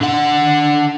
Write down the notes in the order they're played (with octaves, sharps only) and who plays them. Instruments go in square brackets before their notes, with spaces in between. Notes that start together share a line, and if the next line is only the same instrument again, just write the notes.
[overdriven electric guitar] D3 F#5